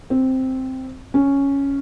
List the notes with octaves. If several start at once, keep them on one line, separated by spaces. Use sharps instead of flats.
C4
C#4